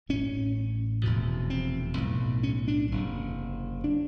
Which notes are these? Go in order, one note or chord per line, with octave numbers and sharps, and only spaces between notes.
A1 A2 C#4
F1 E2 B2
C4
B1 A2
C#4
D4
F#1 E2 C3
C#3 D4